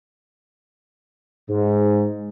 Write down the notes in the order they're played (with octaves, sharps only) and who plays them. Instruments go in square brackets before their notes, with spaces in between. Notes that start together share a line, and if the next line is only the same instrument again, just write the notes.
[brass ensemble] G#2